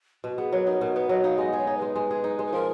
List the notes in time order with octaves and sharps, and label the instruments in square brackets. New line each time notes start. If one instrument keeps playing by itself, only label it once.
[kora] B2 [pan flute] F#4
[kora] B3 [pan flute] G#4
[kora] F#3 [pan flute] A#4
[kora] D#4 [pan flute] A#4
[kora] B2 [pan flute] A#4
[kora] B3 [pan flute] B4
[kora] F#3 [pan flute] D#5
[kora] D#4 [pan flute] F5
[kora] G#3 [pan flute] D#5
[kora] G#4 [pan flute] C#5
[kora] D#4
[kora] G#3 [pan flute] B4
[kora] G#3
G#4
D#4
G#3
[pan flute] B4
[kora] F3 [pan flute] A#4